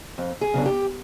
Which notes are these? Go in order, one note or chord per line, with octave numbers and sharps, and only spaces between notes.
F2
G#4
C#3 F#3 B3 D4
G4